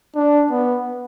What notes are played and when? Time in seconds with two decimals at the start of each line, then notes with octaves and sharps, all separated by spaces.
0.15 D4
0.51 B3